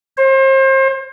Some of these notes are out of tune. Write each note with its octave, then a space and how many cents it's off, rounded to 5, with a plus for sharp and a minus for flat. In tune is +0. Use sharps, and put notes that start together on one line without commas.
C5 +35